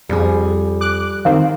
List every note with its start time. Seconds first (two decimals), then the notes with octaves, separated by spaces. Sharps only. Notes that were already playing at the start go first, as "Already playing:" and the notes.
0.09 F2 G3 G#4
0.81 D6 F#6
1.25 D#3 C4 F5